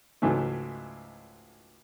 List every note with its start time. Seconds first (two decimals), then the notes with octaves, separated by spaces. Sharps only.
0.22 C#2 G#2 E3 F#3 A3